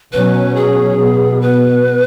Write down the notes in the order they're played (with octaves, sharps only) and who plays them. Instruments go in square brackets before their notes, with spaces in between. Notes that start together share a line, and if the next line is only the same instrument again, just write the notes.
[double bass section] B2 F#3 C#4 [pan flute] B4
[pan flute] G#4
[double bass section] B2 B3
[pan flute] B4